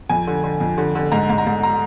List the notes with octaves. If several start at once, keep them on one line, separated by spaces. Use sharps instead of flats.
F2 G#5
D3
D3
F2
D3
D3
G#2 A#5
G#2
A#5
G#2
A#5